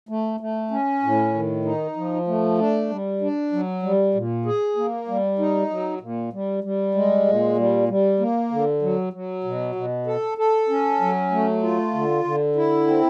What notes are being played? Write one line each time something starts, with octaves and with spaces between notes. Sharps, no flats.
A3
A3
C#4
A2
D#3
D#4
F3
A3
D4
G3
D4
F#3
G3
A#2
G#4
A#3
G3
D#4
F#3
A#2
G3
G3
G#3
A#2
G3
G3
A#3
D3
F#3
F#3
B2
B2
A4
A4
C#4
F#3
A3
F4
D3
D3
E4
C4